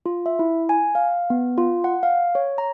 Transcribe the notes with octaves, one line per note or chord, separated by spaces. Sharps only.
F4
E5
E4
G#5
F5
B3
F4
F#5
F5
C#5
A#5